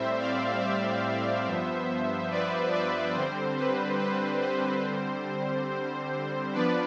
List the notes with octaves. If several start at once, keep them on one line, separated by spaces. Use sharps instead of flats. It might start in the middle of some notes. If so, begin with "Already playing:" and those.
Already playing: A2 G3 C4 C5 E5
D5 F5
C5 E5
G2 F3 B3
B4 D5
B4 D5
D3 G3 C4 C5
B4
B4
C5
D3 G3 C4
F3 B3 D4 B4 D5